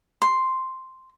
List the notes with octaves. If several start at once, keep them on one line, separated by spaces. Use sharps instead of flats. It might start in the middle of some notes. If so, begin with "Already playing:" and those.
C6